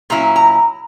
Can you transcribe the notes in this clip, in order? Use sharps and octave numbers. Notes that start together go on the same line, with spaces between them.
A#2 F#3 C#4 E4 A#5
A#5